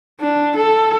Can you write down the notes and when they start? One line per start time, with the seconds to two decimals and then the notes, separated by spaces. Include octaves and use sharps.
0.20 D4
0.56 A4